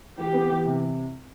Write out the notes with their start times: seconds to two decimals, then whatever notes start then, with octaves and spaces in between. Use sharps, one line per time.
0.18 E3 G4
0.33 B3
0.49 E3
0.66 C3